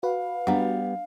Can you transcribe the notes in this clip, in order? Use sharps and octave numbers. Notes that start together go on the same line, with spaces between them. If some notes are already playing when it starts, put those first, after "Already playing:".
F#4 B4 F5
G3 B3 D4 F#5